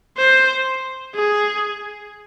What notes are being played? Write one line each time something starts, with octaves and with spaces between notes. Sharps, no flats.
C5
G#4